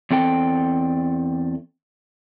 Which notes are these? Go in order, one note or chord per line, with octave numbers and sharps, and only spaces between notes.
E2 C4 A4 G5